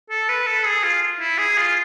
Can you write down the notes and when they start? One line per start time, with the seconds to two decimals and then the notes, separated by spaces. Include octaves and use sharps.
0.10 A4
0.29 B4
0.46 A4
0.66 G#4
0.83 F4
1.20 E4
1.38 G#4
1.58 F4